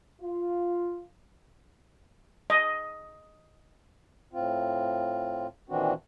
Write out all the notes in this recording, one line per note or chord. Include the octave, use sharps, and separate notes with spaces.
F4
D#5
A2 C4 F4
A#2 D#3 E3 C4 D4 F#4